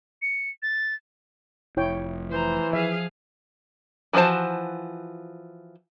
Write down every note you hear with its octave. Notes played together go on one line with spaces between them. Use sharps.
C#7
A6
F1 E4 C#5 G5
E3 C5 A#5
F3 G#4 E5 F5
E3 F3 F#4 C5 A5